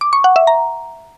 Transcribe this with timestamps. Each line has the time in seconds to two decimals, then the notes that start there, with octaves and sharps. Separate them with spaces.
0.01 D6
0.13 C#6
0.24 F#5
0.36 E5
0.47 A#5